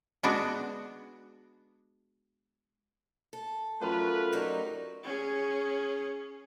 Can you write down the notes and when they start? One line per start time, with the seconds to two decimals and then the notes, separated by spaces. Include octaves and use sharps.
0.23 G#3 B3 D4 F#4
3.33 A4
3.81 F#2 A3 F4 B4 C#5 G5
4.33 F#3 G3 D#4
5.04 C#4 G#4